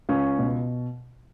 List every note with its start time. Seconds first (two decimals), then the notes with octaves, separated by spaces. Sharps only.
0.09 C#2 C#4
0.39 B2